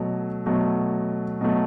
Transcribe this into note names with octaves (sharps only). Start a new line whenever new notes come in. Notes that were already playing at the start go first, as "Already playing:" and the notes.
Already playing: B2 F#3 A3
B2 F#3 A3
B2 F#3 A3